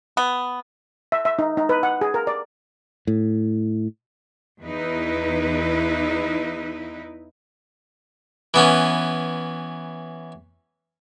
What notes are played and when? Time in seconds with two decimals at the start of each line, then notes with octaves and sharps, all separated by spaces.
0.17 B3
1.12 E5
1.25 E5
1.39 D#4
1.57 D#4
1.69 B4
1.83 F#5
2.01 G#4
2.14 A#4
2.27 D5
3.07 A2
4.64 E2 D#4 E4 B4
8.54 E3 B3 C#4